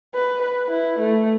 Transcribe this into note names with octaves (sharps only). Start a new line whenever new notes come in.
B4
B4
E4
A3